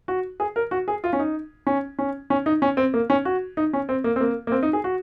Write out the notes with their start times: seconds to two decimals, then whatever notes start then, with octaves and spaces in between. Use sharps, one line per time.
0.08 F#4
0.40 G#4
0.56 A#4
0.71 F#4
0.88 G#4
1.04 F4
1.13 C#4
1.19 D#4
1.67 C#4
1.99 C#4
2.30 C#4
2.46 D#4
2.62 C#4
2.77 C4
2.94 A#3
3.10 C#4
3.25 F#4
3.57 D#4
3.73 C#4
3.89 C4
4.04 A#3
4.16 C4
4.21 A#3
4.47 A#3
4.52 C4
4.63 D#4
4.73 G#4
4.84 F#4